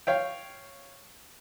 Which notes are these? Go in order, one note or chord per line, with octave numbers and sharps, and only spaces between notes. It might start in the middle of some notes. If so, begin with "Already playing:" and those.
C#5 F5 G5